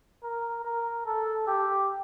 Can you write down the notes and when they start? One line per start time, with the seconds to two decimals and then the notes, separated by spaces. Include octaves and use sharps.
0.23 A#4
0.64 A#4
1.05 A4
1.47 G4